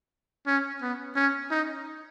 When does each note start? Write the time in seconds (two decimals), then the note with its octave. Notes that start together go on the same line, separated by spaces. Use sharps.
0.47 C#4
0.82 B3
1.16 C#4
1.51 D#4